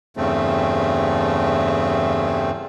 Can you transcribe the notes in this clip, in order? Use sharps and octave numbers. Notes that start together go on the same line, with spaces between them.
E2 G2 C#3 A3 C4